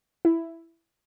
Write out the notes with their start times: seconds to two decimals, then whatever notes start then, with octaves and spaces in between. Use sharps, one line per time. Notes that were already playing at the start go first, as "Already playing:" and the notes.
0.25 E4